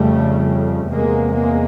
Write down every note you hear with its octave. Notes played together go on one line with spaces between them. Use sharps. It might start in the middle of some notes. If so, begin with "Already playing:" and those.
Already playing: F2 C#3 G3 A3
E2 C3 G#3 A#3
G#3 A#3